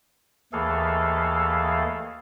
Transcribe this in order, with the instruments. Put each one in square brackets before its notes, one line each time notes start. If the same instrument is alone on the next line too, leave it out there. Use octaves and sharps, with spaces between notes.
[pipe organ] D#2 E3 A3 G#4 A4 F5